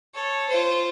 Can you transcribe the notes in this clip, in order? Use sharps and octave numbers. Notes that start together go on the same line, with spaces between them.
A4 C#5
F4 C5